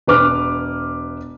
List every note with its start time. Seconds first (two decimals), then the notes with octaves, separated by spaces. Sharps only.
0.07 E1 B4 D6 F6